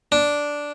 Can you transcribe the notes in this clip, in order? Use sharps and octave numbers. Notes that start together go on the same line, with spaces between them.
D4